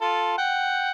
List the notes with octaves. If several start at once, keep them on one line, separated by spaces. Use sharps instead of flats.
F4 A4
F#5 G5